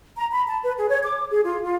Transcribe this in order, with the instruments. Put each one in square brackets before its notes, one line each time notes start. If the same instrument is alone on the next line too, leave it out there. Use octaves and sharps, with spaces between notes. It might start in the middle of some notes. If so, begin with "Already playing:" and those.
[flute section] A#5
B5
A5
B4
G#4
C#5
D6
G#4
F4
F4